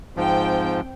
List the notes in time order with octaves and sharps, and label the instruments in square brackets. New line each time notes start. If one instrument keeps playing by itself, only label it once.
[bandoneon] G#2 F3 [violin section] C4 G5